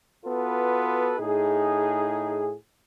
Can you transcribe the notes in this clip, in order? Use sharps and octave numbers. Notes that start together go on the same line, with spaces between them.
B3 F4 F#4 A4 B4
A2 D#4 G#4